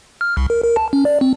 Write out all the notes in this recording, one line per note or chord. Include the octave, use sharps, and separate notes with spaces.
F6
C2
A#4
A#4
A5
C#4
D5
C4